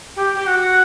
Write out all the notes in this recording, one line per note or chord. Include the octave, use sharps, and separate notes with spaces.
G4
G4
F#4